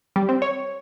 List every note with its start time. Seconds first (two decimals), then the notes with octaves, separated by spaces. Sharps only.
0.16 G3
0.29 C4
0.42 C#5